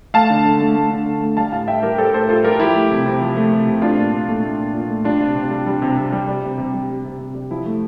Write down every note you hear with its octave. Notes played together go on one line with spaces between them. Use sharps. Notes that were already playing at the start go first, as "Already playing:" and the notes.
A3 F5 A5
D3
D3
A3
A3
D3
D3
A3
G3 F5 A5
A2 F5 A5
A2 E5 G5
G3 G4 A#4
G3 A4 C5
A2 A4 C5
A2 F4 A4
G3 G4 A#4
F3 E4 G4
A3
C3
C3
F3
A3
C3
C3
A3 D4 F4
A#2
A#2
A3
A3
A#2
A#2
A3
G3 D4 F4
C3
C3
G3
G3
C3
C3
G3
G3
C3
C3
G3
G3
C3
C3
G3
F3 E4
A3